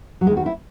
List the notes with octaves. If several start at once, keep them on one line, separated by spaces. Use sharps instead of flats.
F#3
E2 D#3 G#3
F#4
E4